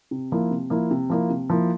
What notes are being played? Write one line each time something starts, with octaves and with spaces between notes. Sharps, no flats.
C3
F3 A#3 E4
C3
F3 A#3 E4
C3
F3 A#3 E4
C3
F3 A#3 E4